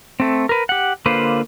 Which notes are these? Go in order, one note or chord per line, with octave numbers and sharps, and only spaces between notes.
A3 C4
A#4 B4
G4 F#5
D3 A#3 F4 B4 C5